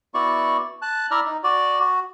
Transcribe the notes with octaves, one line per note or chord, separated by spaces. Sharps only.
B3 E4 F#4 D5 C#6
A5 F#6
E4 D5 E5 A#5 F6
D#4
F#4 D5
F#4